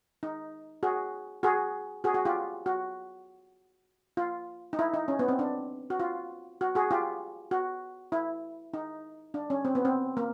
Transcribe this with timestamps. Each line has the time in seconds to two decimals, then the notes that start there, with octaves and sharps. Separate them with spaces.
0.23 D#4
0.83 F#4 G#4
1.43 F#4 G#4
2.04 F#4 G#4
2.14 F#4
2.25 F4 G4
2.66 F#4
4.17 F4
4.73 D#4
4.79 E4
4.94 D#4
5.08 C#4
5.19 B3
5.28 C4
5.39 D4
5.90 F#4
6.00 F4
6.61 F#4
6.75 F#4 G#4
6.91 F4 G4
7.51 F#4
8.12 E4
8.74 D#4
9.34 D4
9.50 C#4
9.65 C4
9.75 B3
9.85 C4
10.17 A#3